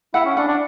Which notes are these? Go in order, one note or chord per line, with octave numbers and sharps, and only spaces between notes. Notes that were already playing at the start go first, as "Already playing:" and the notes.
E4 F#5
C#4
D4 F#5
D4